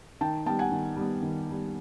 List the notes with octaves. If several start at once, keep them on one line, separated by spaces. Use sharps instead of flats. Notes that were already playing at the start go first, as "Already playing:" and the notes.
D#3 G5 A5
G3 B3 G5 A5
F#5 G#5
D#3
G3 B3
D#3
G3 B3